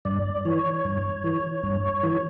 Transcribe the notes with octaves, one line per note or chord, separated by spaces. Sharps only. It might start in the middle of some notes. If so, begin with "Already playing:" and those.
G2 D5
E3 C#5
G2
E3
G2
E3